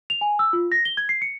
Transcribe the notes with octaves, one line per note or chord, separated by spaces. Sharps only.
F7
G#5
E6
F4
A#6
G7
G#6
C7
C#7